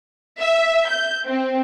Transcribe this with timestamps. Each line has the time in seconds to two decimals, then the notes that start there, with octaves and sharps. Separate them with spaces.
0.39 E5
0.88 G6
1.27 C4